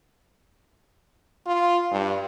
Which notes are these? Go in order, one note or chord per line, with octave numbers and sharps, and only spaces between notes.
F4
G2